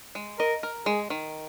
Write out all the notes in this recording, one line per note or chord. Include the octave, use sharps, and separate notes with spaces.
G#3
A#4 D#5
A#4
G#3 G#4
D#3